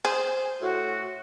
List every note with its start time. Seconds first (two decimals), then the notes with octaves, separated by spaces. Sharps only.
0.05 G#4 C5
0.61 A2 F#4